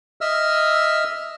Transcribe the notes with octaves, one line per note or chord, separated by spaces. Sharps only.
D#5 E5 E6 F6